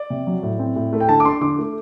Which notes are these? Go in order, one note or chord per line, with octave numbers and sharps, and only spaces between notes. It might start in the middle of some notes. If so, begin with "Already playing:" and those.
Already playing: D5
C3
F#3
A2
C4
A2
A3
G5
D3 A5
D6
D4 C6
D3 D6
A3